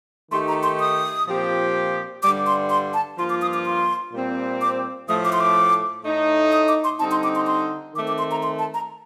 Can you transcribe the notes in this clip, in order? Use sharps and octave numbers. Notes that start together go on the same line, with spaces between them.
D#3 A3 D#4 G4 C6
A#5
C6
D#6
A#2 F3 C4 G4
G2 D3 G3 D6
C6
C6
A5
G2 F3 A#3 F4 C6
D6
D#6
D6
C6
A#2 G3 C4
D6
A2 F3 A3 D#6
D6
C6
D6
A2 A3 D#4
D#6
D6
C6
D3 G3 C4 D#4 A5
C6
D6
C6
C6
D#3 A3 C4 D6
D6
C6
A#5
C6
A5
A#5